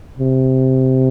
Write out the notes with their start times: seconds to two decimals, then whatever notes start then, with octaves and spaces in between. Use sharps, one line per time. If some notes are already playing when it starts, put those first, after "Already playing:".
0.19 C3